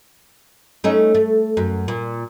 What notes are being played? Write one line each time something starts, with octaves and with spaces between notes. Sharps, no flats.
A3 C#4 D#4
A3
F#2
A#2